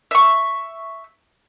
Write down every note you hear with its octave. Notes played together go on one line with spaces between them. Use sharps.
E5 C#6